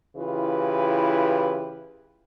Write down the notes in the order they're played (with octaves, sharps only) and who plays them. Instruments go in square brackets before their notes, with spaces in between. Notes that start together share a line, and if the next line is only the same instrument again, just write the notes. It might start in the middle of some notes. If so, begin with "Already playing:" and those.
[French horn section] C#3 E3 E4 F4 G4 B4